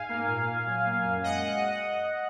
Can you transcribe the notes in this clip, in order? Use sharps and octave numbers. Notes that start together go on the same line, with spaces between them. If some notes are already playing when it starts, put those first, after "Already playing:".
Already playing: G#2 F5 G#5
A#3
A#2
A#2
F#3
A#3
F#2
G#3 D#5 F#5